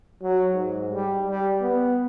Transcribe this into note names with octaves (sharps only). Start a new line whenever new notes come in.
F#3
G#2
G3
G3
B3